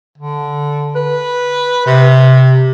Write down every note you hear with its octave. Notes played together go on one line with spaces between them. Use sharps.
D3
B4
C3